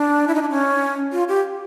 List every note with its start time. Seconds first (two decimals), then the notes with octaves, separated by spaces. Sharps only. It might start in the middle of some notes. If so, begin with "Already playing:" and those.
Already playing: D4
0.28 E4
0.35 D#4
0.42 D4
0.50 C#4
1.12 F4
1.28 G4